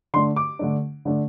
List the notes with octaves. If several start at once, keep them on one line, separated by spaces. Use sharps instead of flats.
D3 A3 D4 C6
D6
D3 A3 D4
D3 A3 D4